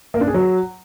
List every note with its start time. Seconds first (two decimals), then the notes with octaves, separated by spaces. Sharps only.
0.14 A#3
0.21 D4
0.28 G#4
0.34 F#3